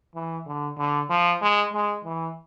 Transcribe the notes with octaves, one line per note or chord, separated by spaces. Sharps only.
E3
D3
D3
F3
G#3
G#3
E3